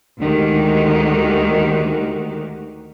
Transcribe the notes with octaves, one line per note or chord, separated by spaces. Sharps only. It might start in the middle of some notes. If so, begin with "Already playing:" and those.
D2 D#3 G#3 F#4 G4